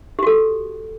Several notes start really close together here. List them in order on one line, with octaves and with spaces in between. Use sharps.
G4 F#4 A4